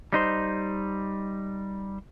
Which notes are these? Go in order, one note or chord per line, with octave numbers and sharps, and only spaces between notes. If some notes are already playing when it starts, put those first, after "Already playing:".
G3 D#4 C5